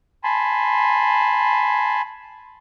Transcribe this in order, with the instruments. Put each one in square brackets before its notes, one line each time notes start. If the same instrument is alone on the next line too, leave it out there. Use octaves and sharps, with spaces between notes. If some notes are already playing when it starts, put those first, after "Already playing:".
[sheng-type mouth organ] G#5 A5 B5 C6